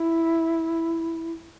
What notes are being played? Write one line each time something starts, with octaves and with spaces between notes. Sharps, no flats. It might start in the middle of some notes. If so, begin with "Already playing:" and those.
Already playing: E4